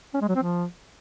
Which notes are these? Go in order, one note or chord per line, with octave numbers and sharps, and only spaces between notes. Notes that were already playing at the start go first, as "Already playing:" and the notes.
C#4
G#3
F#3
C4
F3